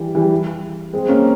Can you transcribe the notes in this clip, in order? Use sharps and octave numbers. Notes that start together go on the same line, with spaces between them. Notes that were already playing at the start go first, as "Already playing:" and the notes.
Already playing: E3 G3
E3 G3
G#3 C4
A#3 C#4